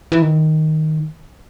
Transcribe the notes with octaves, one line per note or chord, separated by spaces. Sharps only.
E3
D#3